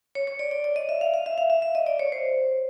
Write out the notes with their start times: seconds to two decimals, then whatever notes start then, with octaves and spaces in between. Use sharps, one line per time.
0.15 C#5
0.27 C#5
0.39 D5
0.51 D5
0.64 D5
0.76 D#5
0.89 E5
1.01 F5
1.14 F5
1.26 E5
1.38 F5
1.50 E5
1.62 E5
1.75 D#5
1.87 D5
1.99 C#5
2.12 C5